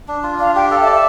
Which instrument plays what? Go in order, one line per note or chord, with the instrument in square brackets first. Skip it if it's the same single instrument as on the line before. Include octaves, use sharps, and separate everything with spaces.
[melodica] D4
F4
[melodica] D4 [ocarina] F5
[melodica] G4 [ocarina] G5
[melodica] A4 [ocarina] F5
[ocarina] E5
[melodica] D5
[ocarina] E5